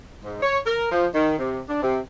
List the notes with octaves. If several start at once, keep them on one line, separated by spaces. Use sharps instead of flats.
G#2
C#5
A#4
F3
D#3
C3
D4
C3